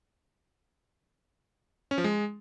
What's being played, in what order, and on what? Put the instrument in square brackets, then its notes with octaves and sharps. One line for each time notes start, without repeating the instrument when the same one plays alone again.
[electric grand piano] C#4
F3
G#3